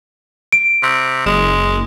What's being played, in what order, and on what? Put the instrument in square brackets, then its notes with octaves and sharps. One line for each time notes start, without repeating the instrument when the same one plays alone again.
[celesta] D7
[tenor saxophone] C3
[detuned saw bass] F#1 [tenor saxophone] G#3